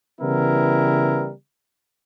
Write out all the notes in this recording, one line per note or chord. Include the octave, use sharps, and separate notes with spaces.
C#3 E3 G3 B3 E4 A#4